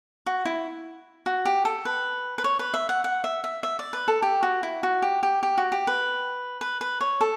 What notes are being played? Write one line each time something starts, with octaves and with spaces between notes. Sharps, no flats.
F#4
E4
F#4
G4
A4
B4
B4
C#5
B4
E5
F#5
F#5
E5
E5
E5
D5
B4
A4
G4
F#4
E4
F#4
G4
G4
G4
F#4
G4
B4
B4
B4
C#5
A4